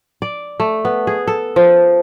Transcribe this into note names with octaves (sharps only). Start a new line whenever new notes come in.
D5
A3
B3
G#4
A4
F3